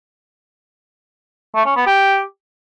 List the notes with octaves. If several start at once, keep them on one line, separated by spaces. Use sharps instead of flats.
A3
C#4
B3
G4